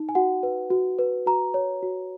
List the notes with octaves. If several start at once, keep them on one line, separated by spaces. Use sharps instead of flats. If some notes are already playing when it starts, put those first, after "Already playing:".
Already playing: D#4
G#5
F#4 F#5
B4
F#4
B4
F#4 A#5
C#5
F#4